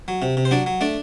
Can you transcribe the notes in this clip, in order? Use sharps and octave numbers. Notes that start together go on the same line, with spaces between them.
F#3
C3
C3
C5
F#3 D4 D5
F#3
A3 D4 D5